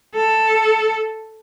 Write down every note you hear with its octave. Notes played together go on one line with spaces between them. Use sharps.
A4